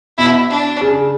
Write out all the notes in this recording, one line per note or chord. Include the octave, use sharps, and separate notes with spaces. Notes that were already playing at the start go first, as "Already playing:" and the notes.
B2 E4
D4
C#3